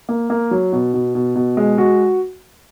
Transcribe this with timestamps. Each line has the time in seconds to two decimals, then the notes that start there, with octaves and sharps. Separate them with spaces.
0.09 A#3
0.30 A#3
0.51 F#3
0.72 B2
0.94 B2
1.15 B2
1.35 B2
1.57 G#3
1.78 F#4